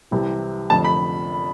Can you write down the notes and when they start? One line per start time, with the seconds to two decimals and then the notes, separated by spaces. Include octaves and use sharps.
0.11 C2 C3 E3
0.70 F1 F2 D3 A5
0.84 B5